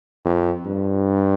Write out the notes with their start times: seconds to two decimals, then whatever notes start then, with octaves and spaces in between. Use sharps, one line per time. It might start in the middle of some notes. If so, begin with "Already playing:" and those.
0.25 F2
0.66 G2